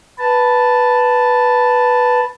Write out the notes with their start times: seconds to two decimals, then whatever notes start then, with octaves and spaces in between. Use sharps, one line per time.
0.19 B4 A5